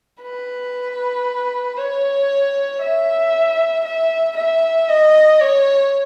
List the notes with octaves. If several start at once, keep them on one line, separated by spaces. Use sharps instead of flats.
B4
C#5
E5
E5
E5
D#5
C#5